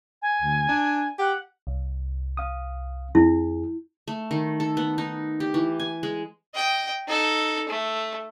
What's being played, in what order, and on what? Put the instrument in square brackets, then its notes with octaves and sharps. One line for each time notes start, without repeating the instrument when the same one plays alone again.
[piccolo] G#5
[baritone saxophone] D2
D4
[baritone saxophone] G4 [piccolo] F#5
[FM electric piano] C2
[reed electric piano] F5 D#6
[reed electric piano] F2 G#4 [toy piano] E4
[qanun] A3
D#3
A4
B3
D#4
G4
E3
G#5
G#3
[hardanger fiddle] D#5 G5
D#4 A4
A3